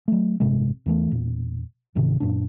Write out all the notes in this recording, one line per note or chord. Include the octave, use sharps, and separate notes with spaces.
F#3 A3
A1 G2 C3 G#3
E2 E3 A3
E1 A#2
C#2 G#2 C3 D#3
F#2 A#2 D4